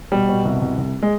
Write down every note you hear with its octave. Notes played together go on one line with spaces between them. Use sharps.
B2 G3
B2
C2
C2
C2
G#3